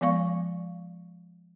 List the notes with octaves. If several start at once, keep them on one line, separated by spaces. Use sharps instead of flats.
F3 G#3 B3 D5 F5 C#6